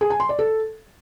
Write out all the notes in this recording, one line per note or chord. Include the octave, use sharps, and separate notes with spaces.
G#4
G#5
C6
D5
A4